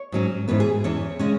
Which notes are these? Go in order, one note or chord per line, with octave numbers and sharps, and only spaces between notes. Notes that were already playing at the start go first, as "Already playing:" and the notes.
Already playing: C#5
G#2 F#3 C#4
G#2 E3 B3 B4
G#4
E2 E3 C#4 C#5
C#3 G#3 C#4